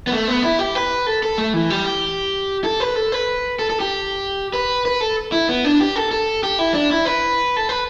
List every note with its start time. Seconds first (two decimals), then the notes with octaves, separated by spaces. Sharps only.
0.07 B3
0.13 A3
0.28 B3
0.43 E4
0.59 G4
0.75 B4
1.07 A4
1.23 A4
1.38 A3
1.54 E3
1.70 G3
1.86 G4
2.64 A4
2.80 B4
2.96 A4
3.12 B4
3.59 A4
3.70 A4
3.80 G4
4.53 B4
4.86 B4
5.01 A4
5.32 E4
5.49 B3
5.65 D4
5.80 G4
5.96 A4
6.11 A4
6.43 G4
6.59 E4
6.74 D4
6.91 E4
7.05 B4
7.57 A4
7.69 B4